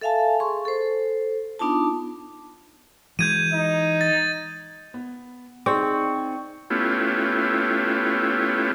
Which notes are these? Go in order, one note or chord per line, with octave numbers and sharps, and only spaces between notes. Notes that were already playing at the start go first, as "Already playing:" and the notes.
A4 E5 F5 G#5 A5
G#4 C6 C#6
A4 C5
B3 D4 D#4 F4 A5
E3 G#3 G6 G#6 D#7
D#4
A6
B3
C4 D#4 G#4 D5 C#6
A3 B3 C#4 E4 F4 G4